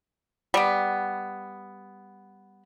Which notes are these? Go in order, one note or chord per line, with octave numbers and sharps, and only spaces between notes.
G3 B3